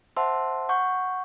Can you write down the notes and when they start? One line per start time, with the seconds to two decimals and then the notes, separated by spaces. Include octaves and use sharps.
0.17 C5 E5 F#5 A5 C6 E6
0.69 F#5 C#6 G6